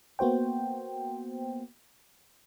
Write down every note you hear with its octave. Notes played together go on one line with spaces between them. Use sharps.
A#3 B3 F#4 C5 G5